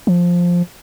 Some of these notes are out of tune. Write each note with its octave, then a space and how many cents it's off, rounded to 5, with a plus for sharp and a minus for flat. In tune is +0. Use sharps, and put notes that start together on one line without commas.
F3 +5